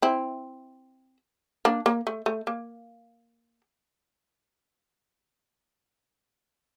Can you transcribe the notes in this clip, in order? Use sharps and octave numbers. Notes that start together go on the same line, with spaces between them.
C4 E4
A#3 D4
A#3
A3
A3
A#3